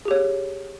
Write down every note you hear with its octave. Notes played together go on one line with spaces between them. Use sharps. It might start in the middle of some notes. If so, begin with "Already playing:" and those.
G4 G#4 C#5